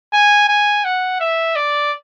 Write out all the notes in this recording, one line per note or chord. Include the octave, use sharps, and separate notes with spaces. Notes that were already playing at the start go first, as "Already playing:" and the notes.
G#5
G#5
F#5
E5
D5